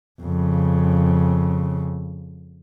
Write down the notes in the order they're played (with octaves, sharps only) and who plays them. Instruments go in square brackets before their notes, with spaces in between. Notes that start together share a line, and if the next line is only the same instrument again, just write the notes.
[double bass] F2 C#3